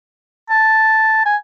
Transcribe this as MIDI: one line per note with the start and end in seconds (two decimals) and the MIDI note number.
0.50 1.21 81
1.25 1.36 80